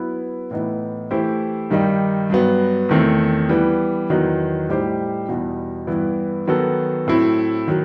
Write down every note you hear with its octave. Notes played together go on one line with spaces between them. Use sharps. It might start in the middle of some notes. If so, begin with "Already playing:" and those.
Already playing: F#3 B3 E4 B4
A2 E3 B3 D#4
E3 A3 E4 G4 C5
G2 D#3 G3 D#4
G2 F#3 B3
E2 D#3 A3 C4
E3 G3 B3
E2 D#3 F#3 B3 D#4
A2 G3 D#4 G4 C5
E2 B2 G3 D#4 F#4
G2 E3 B3 E4
D#3 F#3 B3 F#4 A4
A2 F#3 A3 C4 E4
D#3 F#3